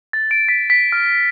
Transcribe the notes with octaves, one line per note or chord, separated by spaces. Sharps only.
A6
D7
B6
B6
F6